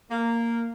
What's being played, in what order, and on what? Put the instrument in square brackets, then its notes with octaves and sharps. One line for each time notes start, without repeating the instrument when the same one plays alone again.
[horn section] A#3